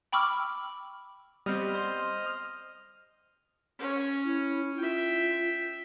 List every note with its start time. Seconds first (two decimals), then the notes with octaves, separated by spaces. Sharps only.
0.12 G5 B5 C#6 D6 E6 F6
1.46 G3 B3 C4 D#5 F6
1.75 C5
3.79 C#4 C#5
4.25 E4
4.78 F4 E5 G5